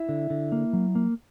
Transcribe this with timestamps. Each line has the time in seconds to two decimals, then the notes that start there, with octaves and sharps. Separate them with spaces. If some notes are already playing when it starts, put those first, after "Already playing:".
Already playing: E4 E5
0.09 D3
0.30 D3
0.52 A#3
0.73 F#3
0.95 A#3